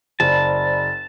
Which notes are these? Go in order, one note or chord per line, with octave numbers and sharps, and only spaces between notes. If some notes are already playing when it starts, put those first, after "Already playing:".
F#1 C5 D5 A5 B5